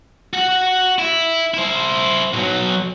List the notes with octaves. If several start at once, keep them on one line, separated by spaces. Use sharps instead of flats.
F#4 F#5
E4
E4 C5
B1 F#3